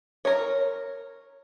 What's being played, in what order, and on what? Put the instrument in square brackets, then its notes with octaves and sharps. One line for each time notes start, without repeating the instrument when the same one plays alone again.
[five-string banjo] A#4 C#5